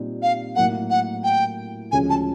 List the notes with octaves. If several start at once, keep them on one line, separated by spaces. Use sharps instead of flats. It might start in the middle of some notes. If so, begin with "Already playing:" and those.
Already playing: A#2 G3 C4 D#4
F5
A2 F#3 A#3 F#5
F#5
G5
D2 C#3 F3 G#3 C#4 G#5
A5